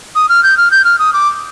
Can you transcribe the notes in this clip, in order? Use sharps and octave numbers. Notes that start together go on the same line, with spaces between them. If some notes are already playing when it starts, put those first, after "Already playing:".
D#6
F6
G6
F6
G6
F6
D#6
D6